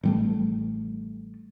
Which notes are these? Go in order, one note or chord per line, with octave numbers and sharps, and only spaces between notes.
A1 G3 A3